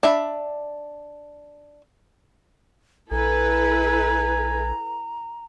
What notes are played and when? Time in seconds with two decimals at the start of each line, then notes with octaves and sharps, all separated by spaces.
0.03 D4 E5 B5
3.11 A#1 E4 A4 B4 G#5 A#5